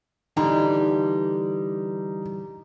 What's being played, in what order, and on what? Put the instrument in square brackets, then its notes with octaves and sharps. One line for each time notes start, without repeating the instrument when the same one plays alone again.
[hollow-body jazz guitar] D3 E3 G3 [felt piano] D#4